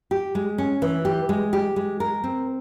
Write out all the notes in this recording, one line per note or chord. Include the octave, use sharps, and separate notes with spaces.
G4
G#3
C#4
E3
G4
G#3
G4
G#3
A#4
C4